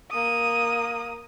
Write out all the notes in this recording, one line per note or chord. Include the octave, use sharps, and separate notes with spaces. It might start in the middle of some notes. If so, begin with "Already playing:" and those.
A#3 D#6